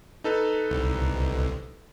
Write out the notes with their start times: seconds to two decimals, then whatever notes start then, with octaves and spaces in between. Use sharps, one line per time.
0.24 D#4 A4 B4
0.70 C2